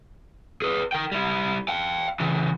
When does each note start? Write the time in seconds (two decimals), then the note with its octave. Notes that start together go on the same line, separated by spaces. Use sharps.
0.62 G#4 B4
0.92 A#4 G5
1.12 G3 E4
1.68 F5 G5
2.20 C#3 E3